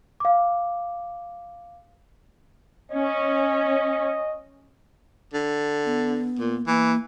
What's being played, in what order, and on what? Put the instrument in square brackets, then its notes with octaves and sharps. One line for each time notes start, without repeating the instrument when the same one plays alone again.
[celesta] F5 D6
[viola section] C#4 [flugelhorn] D#5
[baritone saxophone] D3
[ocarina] B3
[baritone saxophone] A#2
[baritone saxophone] E3 [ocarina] A#3